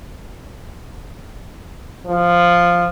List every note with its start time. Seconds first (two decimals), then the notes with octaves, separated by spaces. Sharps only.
2.06 F3